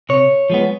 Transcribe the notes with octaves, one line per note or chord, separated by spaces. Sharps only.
C3 C#5
F3 G#3 B3